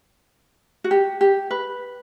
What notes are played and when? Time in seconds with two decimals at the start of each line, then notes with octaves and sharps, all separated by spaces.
0.84 F#4
0.91 G4
1.21 G4
1.51 B4